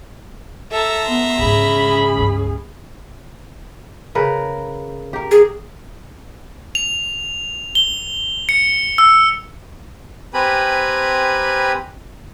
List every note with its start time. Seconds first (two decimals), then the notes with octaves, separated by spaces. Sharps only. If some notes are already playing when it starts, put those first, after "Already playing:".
0.72 A4 E5 A#5
1.06 B3 C6
1.39 G#2 C#3 C#4 G#4 B5
2.17 C#2 G2
4.15 C#3 A#4 B4
5.13 G4 A#4
5.31 G#4
6.75 F7
7.75 G7
8.49 C#7
8.98 E6
10.34 C4 G4 B4 G#5 A#5 B5